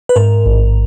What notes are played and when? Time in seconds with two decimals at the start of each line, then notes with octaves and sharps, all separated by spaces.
0.09 B4
0.16 G#2 A#4
0.46 A1